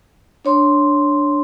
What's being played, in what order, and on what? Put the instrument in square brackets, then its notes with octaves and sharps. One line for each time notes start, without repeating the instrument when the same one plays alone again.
[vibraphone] D4 C#5 C6